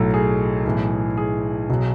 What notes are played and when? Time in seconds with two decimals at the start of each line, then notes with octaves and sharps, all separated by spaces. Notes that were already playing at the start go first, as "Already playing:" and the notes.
Already playing: B1 A2 F#3 A4
0.14 G#4
0.65 B1 A2 E3
1.17 G#4
1.69 B1 B2 F#3